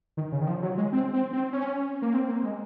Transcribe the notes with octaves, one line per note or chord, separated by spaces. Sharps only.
D#3
C#3
D#3
F3
F#3
G#3
C4
C4
C4
C#4
A#3
C4
A#3
G#3